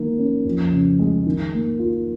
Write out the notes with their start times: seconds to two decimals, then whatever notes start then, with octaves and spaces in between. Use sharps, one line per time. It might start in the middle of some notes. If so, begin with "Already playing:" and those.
Already playing: D#3 G#3 A#3
0.18 C#4
0.45 F2
0.71 C#3
0.99 G#3
1.26 D#3
1.53 A#3
1.79 F4